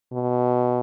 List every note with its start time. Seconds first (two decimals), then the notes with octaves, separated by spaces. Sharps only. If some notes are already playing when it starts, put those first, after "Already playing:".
0.13 B2